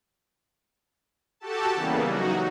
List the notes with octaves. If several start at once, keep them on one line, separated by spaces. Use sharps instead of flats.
F#4 G4 A4 A5
C#3 E3 G3 A#3 B3
F#3 D#4 F#4